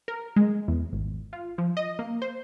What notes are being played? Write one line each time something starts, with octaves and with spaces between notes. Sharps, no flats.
A#4
G#3
E2
G#1
F4
F3
D#5
A#3
C5